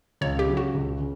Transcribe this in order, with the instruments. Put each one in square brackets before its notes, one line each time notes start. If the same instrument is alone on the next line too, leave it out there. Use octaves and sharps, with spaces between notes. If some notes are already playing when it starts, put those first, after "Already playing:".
[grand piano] C#2 [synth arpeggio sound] C#5
[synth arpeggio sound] G4
[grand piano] C#3 F#3
[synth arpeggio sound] F#4
[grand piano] C#2
C#3